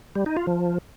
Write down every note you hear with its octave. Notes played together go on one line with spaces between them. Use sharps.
G3
D#4
F4
F3